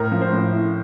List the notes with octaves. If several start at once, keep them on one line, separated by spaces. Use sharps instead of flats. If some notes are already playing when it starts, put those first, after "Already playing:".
Already playing: A2 A#4
F3
C5
A2
E4